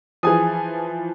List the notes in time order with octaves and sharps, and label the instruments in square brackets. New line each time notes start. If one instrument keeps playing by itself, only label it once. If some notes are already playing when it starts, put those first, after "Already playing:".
[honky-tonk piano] E3 F3 [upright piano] G#4 G#5 D#6